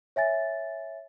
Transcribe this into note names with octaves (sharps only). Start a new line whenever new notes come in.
C#5 E5 G#5 A6